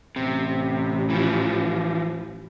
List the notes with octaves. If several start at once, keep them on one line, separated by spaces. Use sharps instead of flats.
A1 C3
E3 F3